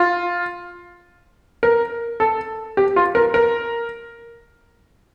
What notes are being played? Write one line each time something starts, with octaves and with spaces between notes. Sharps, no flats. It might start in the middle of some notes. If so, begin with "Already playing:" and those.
Already playing: F4
A#4
A4
G4
F4
A#4
A#4